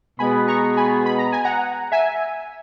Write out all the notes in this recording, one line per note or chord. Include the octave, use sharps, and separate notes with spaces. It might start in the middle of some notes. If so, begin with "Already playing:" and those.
B2 G#3 B3 G#5 B5
A#5 C#6
G#5 B5
B5
A#5
G#5
F#5 A#5
E5 G#5